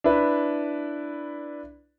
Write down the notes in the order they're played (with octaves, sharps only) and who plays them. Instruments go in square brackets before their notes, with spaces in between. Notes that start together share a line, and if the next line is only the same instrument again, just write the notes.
[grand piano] D4 E4 B4